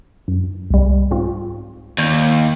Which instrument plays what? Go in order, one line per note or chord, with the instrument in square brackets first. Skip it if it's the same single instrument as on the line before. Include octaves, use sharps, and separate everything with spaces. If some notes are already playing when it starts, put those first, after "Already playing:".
[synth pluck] F#2
C2 G3
G#2 C4 F4
[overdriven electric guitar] D#2 [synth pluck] D5 G6